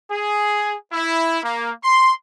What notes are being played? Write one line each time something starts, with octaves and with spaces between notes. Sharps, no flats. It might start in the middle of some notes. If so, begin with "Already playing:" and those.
G#4
E4
A#3
C6